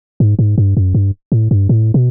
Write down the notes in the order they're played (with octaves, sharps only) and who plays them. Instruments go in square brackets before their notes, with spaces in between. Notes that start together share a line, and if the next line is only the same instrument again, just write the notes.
[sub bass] G#2
G#2
G2
F#2
G2
A2
G2
A2
B2